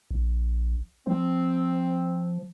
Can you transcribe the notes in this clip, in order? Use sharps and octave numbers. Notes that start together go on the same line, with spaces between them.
A#1
F3 C4